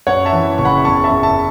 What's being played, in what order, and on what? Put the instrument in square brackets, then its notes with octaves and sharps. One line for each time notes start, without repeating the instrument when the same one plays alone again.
[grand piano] F#2 C#5 F#5
E5 A5
E3
F#1 C#6
F#5 B5
E2 A5 C#6
E5 A5
C#3
E5 A5